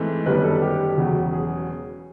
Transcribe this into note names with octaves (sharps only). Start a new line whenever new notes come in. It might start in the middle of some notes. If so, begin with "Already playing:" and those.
Already playing: G#2 E3 A3 C4
G1 F#2 D#3 G3 B4
A4
G4
E1 E2 C#3 F#3
G#4